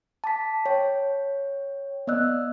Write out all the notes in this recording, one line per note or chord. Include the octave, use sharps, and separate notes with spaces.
A5 D6 B6
C#5 G5
B3 D5 D#5 E6 F#6